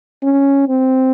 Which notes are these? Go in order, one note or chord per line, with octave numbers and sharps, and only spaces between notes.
C#4
C4